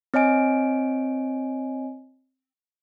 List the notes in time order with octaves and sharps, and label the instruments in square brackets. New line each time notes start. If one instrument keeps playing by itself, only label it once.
[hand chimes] C4 C#5 D#5 G#5 D7